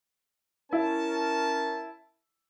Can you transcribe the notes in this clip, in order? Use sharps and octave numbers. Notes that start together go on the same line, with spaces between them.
C#4 E4 A#4 A5